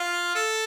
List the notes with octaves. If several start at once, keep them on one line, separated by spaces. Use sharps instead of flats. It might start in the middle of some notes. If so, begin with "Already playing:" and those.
Already playing: F4
A4